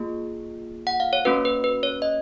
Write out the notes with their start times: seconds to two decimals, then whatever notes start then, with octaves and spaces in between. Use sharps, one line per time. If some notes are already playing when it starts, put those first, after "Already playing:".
Already playing: A#3 F4 G#4
0.87 F#5
1.00 F5
1.13 C#5
1.25 A#3 C#4 F#4 B4
1.45 B4
1.64 B4
1.83 C#5
2.02 D#5